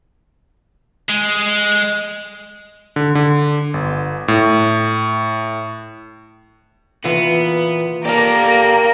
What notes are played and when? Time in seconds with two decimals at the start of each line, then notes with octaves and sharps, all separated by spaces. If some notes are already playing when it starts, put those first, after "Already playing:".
1.10 G#3
2.96 D3
3.15 D3
3.74 G1
4.28 A2
7.04 A#2 E3 B3 F5
8.05 A#3 G4 A4 A#4 D5 F5